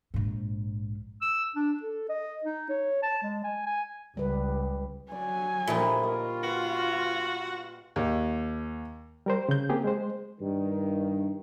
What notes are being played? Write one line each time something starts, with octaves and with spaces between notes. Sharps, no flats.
A#1 G#2
E6
D4
A4
D#5
D#4
C#5
A5
G#3
G#5
G#5
C#2 G3 B4
F#3 D5 G#5
A#2 F3 G3 A3 D#4 E4
F4 A#4 D#5 C#6
F#4 B4
D#2
G3 A#4 C5
C#3 G6
A#3 C4 G4 G#4
G#3 C5
G2 D#3